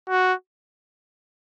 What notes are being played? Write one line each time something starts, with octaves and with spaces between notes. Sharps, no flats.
F#4